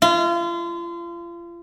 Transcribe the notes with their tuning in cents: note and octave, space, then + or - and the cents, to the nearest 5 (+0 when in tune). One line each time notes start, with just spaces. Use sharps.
F4 -35